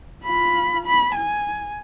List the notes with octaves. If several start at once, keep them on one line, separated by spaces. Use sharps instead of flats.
F4 B5
B5
G#5